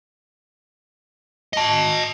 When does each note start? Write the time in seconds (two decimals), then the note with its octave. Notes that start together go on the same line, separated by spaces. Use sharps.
1.53 D#5 A5